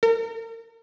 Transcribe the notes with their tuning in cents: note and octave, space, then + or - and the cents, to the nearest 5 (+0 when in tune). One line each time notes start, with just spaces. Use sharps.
A#4 -35